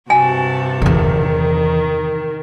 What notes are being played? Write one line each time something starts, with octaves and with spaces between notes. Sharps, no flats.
G2 C3 F#4 G#5 A5
E2 D3 D#3